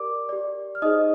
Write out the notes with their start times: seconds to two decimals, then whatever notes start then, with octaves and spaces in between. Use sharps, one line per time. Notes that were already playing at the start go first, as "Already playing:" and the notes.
Already playing: G4 A#4 D5 D6
0.29 G4 D5
0.75 F6
0.82 D#4 G#4 C5 D#5 D#6